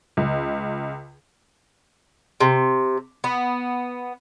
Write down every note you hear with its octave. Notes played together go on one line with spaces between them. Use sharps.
C#2
C3
B3